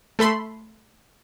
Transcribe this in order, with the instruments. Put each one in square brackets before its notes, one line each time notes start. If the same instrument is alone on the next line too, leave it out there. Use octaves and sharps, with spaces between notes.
[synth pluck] A3 A4 B5 C6